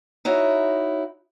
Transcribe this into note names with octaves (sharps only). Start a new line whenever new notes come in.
D#4 E4 F#4 C#5